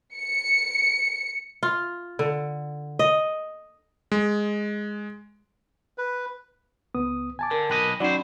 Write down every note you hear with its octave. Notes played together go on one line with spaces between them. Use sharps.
C#7
F4
D3
D#5
G#3
B4
C#2 B3 D#6
G#5 A5 D6
D3 A#4
B1 B4 D#5 G5
F#3 C#4 D#4 F#4 C5 D5 F#5 B5